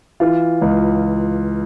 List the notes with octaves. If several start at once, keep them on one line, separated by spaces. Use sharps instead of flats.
E3 F4
C#2